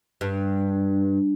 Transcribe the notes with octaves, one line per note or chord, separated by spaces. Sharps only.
G2